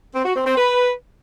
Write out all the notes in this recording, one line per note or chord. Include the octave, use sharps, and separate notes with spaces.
C4
F#4
C4
C4
B4